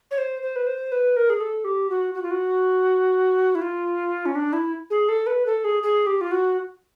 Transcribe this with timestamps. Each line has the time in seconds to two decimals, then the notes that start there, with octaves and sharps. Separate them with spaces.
0.11 C#5
0.18 C5
0.42 C5
0.56 B4
0.67 C5
0.92 B4
1.16 A#4
1.30 G#4
1.40 A4
1.64 G4
1.90 F#4
2.14 F#4
2.22 F4
2.31 F#4
3.55 E4
3.61 F4
4.26 C#4
4.35 D4
4.53 E4
4.90 G#4
5.09 A4
5.27 B4
5.46 A4
5.64 G#4
5.83 G#4
6.06 G4
6.21 F4
6.31 F#4